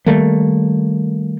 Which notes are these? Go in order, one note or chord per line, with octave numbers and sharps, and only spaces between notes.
D#3 G3 A3 A#3